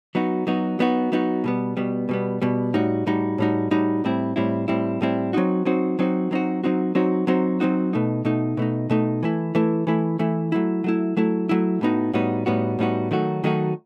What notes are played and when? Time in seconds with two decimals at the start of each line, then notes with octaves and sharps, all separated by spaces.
0.15 F#3 B3 D#4 F#4
0.47 F#3 B3 D#4 F#4
0.79 F#3 B3 D#4 F#4
1.12 F#3 B3 D#4 F#4
1.44 B2 G3 B3
1.77 B2 G3 B3
2.09 B2 G3 B3
2.42 B2 G3 B3
2.74 A2 G3 D#4 F#4
3.06 A2 G3 D#4 F#4
3.38 A2 G3 D#4 F#4
3.71 A2 G3 D#4 F#4
4.04 A2 G3 C4 E4
4.36 A2 G3 C4 E4
4.68 A2 G3 C4 E4
5.01 A2 G3 C4 E4
5.33 F#3 C4 D#4 F#4
5.65 F#3 C4 D#4 F#4
5.99 F#3 C4 D#4 F#4
6.31 F#3 C4 D#4 F#4
6.64 F#3 C4 D#4 F#4
6.95 F#3 C4 D#4 F#4
7.27 F#3 C4 D#4 F#4
7.60 F#3 C4 D#4 F#4
7.93 B2 A3 D#4
8.25 B2 A3 D#4
8.57 B2 A3 D#4
8.90 B2 A3 D#4
9.23 E3 A3 E4
9.55 E3 A3 E4
9.87 E3 A3 E4
10.19 E3 A3 E4
10.52 F#3 A3 E4
10.84 F#3 A3 E4
11.17 F#3 A3 E4
11.49 F#3 A3 E4
11.81 A2 G3 B3 D#4 F#4
12.13 A2 G3 B3 D#4 F#4
12.46 A2 G3 B3 D#4 F#4
12.79 A2 G3 B3 D#4 F#4
13.11 D#3 F#3 A3 D#4 F#4
13.44 D#3 F#3 A3 D#4 F#4